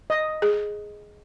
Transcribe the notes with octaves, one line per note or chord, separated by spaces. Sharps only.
D#5
G#4